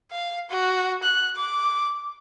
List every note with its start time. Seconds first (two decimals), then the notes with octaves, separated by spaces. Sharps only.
0.11 F5
0.49 F#4
1.03 F#6
1.36 D6